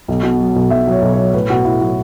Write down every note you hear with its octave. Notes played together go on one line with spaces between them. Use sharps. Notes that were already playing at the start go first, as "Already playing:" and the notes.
B1
B2
F#3
B1
B1 E5
F#3 C#5
B1
F#3 C#5
A2 B4
B1 F#4
A2 E4
F#3 F#4